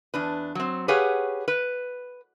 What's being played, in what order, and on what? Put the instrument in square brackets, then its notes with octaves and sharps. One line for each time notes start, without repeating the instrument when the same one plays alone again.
[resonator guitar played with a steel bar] E2 D4 B4
F#3 C4
G4 G#4 B4 C#5 F5 F#5
B4